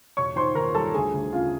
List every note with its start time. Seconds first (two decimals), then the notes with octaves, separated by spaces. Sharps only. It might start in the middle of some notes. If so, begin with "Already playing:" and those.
0.17 E1 C#5 C#6
0.36 D#3 C5 C6
0.55 D#2 A#4 A#5
0.75 G3 A4 A5
0.94 D2 G#4 G#5
1.14 D2
1.32 C#3 F4 F5